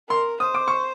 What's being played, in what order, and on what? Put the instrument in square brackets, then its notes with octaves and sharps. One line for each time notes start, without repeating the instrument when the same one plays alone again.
[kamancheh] A#4 [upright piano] C6
[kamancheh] C5 [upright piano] D#6
[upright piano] D6
C#6